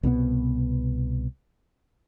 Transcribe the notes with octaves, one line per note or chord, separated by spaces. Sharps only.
C2 B2 E3 B3